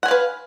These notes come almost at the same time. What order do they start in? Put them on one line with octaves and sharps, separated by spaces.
F#5 G#5 F5 B4